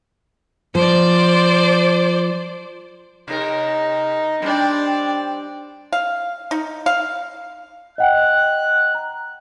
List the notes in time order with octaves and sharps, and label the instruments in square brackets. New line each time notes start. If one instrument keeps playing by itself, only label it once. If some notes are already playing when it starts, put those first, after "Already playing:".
[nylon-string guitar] F3 [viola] C5 D5
[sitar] C3 A#4 [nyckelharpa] D#4
[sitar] G3 C4 [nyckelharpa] D4 D5
[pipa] F5
D#4
F5
[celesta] D#5 F#5 G5 [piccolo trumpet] F#6
[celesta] A#5